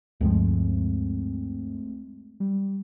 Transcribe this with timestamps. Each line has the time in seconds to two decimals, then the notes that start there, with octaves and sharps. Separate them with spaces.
0.21 D2 G2 F3 G#3 A3 C4
2.40 G3